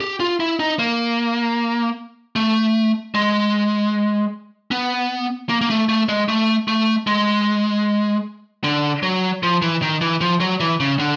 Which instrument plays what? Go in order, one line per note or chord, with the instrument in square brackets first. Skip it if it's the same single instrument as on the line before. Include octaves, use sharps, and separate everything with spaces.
[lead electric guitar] G4
F4
E4
D#4
A#3
A3
G#3
B3
A#3
A#3
A3
A3
G#3
A3
A3
G#3
D3
F#3
F3
E3
D#3
E3
F3
F#3
E3
C#3
D3